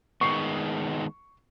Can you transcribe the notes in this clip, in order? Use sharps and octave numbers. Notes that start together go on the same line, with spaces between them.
D#3 G#3 B3 C#6 C7